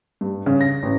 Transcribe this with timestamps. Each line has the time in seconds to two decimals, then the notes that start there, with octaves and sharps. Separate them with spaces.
0.21 G2
0.46 C#3
0.61 A#6
0.83 A1